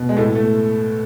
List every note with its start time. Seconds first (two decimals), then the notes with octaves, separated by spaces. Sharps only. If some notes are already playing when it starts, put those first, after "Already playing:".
Already playing: B2
0.09 G#3
0.17 A2 A3
0.35 A3